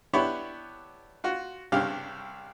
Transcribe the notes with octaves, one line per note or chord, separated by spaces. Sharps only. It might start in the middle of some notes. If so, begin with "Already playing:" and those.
B3 D4 E4 G4 C#5 B5
F4 F#4
C2 G2 C#3 G4 F5